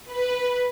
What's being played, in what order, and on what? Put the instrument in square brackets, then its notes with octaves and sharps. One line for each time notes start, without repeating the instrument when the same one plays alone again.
[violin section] B4